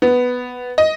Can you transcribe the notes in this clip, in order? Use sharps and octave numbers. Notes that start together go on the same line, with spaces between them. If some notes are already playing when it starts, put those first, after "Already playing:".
B3
D#5